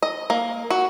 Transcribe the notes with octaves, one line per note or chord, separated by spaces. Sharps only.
D#5
A#3
F#4